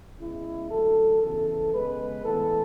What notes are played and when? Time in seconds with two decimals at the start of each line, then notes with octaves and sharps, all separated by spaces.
0.20 C#3 G#3 B3 E4
0.70 D3 F#3 A3 A4
1.22 C#3 E3 B3 A4
1.73 C#3 G#3 B3 B4
2.23 A2 E3 G#3 B3 A4